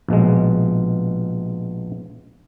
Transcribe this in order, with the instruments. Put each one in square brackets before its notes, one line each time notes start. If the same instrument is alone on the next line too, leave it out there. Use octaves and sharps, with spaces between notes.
[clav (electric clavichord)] A#1 B2 G#3